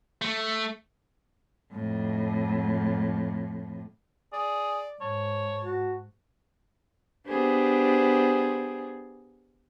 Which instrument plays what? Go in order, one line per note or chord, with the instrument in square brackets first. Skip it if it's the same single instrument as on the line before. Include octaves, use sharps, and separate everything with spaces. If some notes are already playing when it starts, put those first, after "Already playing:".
[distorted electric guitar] A3
[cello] F2 A2
[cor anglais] G#4 [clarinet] D5
[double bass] G#2 [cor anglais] C#5 [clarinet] A5
[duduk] F#4
[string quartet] B3 D4 G4 G#4 C5